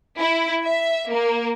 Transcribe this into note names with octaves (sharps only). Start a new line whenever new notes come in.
E4
E5
A#3